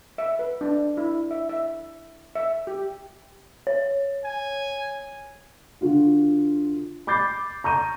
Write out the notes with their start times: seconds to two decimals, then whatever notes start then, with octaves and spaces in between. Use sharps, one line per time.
0.18 E5
0.39 B4
0.61 D4
0.97 E4
1.31 E5
1.49 E5
2.35 E5
2.67 G4
3.67 C#5
4.25 G#5
5.81 D3 F4 F#4
7.07 B5 D6 G6 A6 C7
7.64 A#5 C#6 G6 D#7